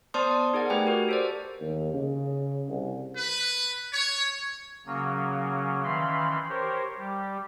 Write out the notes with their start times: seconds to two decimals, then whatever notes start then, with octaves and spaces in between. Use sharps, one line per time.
0.14 B3 C5 D5 A5 C6 D#6
0.31 D5
0.54 D#4 G#4 A#4 D5 F#5
0.70 A3 G4 B4 G5 G#5
0.86 F#4 G4 A#4
1.09 A4 C5 D5
1.60 D#2
1.94 C#3
2.69 C2
3.17 B4
3.92 C#5
4.86 C#3 F#3 A#3 C#4
5.84 D#3 E3 C#4 F5 B5 C6
6.49 G4 A#4 C5 C#5
6.98 G3 G4